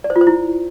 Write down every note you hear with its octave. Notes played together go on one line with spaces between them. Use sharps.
D5
C5
F4
C5
E4